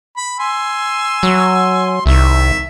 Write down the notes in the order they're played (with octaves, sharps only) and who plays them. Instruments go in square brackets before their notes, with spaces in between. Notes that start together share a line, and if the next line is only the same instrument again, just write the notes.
[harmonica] B5
G#5 C6 E6
[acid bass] F#3
[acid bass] C2 [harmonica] D#3 E5